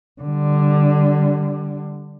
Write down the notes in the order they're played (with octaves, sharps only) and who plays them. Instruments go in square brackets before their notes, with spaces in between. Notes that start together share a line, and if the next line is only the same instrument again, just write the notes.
[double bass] D3 G3